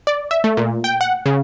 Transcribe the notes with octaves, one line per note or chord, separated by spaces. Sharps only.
D5
E5
A3
A#2
G5
F#5
C#3